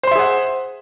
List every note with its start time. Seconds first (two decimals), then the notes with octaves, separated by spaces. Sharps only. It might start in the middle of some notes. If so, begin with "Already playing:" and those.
0.03 C5
0.07 C6
0.11 E5
0.15 G#4
0.19 F#5